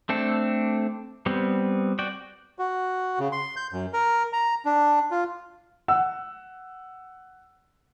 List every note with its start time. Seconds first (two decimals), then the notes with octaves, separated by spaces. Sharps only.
0.09 A3 C4 D4 A4
1.26 G3 B3 C4
1.99 F#4 D5 G5
2.59 F#4
3.19 C#3
3.32 C6
3.56 G6
3.73 F#2
3.93 A#4
4.33 A#5
4.65 D4
5.11 F4
5.88 F#5 E6